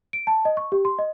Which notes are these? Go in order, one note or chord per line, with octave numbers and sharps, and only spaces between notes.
D7
A5
D#5
C#6
G4
C6
D#5